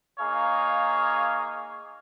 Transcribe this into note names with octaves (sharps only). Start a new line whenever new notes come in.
A#3 D#4 G#4 C#5 F5